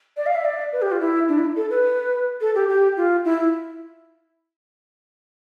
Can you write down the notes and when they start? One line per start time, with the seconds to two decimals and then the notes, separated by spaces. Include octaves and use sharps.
0.17 D5
0.26 F5
0.35 E5
0.45 D5
0.73 B4
0.82 G4
0.92 F4
1.00 E4
1.29 D4
1.38 E4
1.57 A4
1.71 B4
2.41 A4
2.55 G4
2.69 G4
2.97 F4
3.25 E4